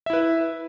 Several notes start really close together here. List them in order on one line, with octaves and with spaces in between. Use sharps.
E5 E4 B4